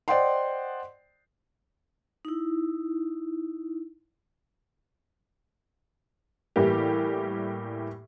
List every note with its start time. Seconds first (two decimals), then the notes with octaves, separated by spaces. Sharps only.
0.08 C5 D5 D#5 F#5 G5 C6
2.25 D#4 E4
6.56 A2 E3 G3 A#3 G4